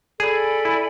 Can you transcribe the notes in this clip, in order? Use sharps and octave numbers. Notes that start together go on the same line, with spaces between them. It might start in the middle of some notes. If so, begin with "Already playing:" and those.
G#4 A4 D5 G#5 B5
E4